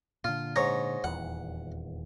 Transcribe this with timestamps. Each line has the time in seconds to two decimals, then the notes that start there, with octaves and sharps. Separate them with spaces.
0.24 A#2 D3 F4
0.56 G#2 C#5 A#5
1.04 D#1 E2 F#5